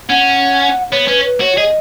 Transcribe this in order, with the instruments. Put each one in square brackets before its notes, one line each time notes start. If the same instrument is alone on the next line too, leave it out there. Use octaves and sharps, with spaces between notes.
[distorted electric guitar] C#4 [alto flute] F#5
[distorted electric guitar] B3 [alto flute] C#5
[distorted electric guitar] C#4 [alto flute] B4
[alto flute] B4
[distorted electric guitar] F#4 [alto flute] C#5
[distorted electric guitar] G#4 [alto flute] D#5